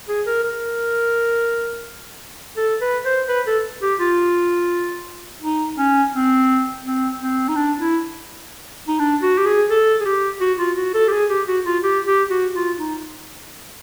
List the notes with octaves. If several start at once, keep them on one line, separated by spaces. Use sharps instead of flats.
G#4
A#4
A#4
A4
B4
C5
B4
A4
G4
F4
D#4
C#4
C4
C4
C4
D#4
D4
E4
D#4
D4
F#4
G4
G#4
A4
G#4
G4
F#4
F4
F#4
A4
G4
G#4
G4
F#4
F4
G4
G4
F#4
F4
D#4